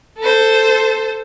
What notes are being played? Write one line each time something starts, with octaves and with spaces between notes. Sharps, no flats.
A4 C5